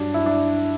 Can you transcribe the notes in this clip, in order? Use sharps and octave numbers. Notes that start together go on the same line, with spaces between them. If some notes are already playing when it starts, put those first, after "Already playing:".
Already playing: G2 F#3 D4
E4
D4